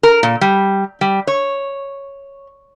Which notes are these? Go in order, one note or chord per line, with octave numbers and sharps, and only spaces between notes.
A#4
A#2
G3
G3
C#5